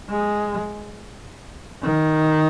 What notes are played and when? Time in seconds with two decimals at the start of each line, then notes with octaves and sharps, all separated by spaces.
0.10 G#3
1.83 D#3